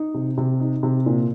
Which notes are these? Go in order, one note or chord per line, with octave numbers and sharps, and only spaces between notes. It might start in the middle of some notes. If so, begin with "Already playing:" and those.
Already playing: D#4
C3
C3
D#4
C3
A#2